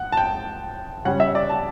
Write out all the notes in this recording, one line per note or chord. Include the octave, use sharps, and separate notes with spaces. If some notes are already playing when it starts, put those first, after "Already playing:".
Already playing: F#5
A5
G5
C#3 G3 C#4 F#5
E5
D5
A5